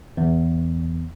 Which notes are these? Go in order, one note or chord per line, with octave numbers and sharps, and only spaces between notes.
E2